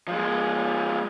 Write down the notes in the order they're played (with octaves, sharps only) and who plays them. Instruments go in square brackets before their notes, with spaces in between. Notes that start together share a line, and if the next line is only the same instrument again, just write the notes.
[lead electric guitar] F3 G#3